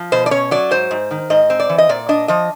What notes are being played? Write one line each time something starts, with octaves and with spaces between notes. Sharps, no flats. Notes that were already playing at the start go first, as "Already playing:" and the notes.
Already playing: F3
B2 C5
D5
C#4 C#5
F#3 D5
G#2 C5
G#2
D#3
G#2 D#5
C4
D5
E3
D#5
A#2 D5
D4 D#5
F3 D#5